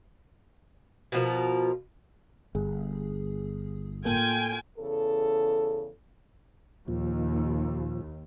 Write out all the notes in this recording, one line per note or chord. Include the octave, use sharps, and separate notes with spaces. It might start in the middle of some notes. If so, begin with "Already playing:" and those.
B2 F3 A#4
G1 G2 G#4
A2 A#3 F4 A4 G5 G#5
E2 C#3 A4
D#2 A#2 F3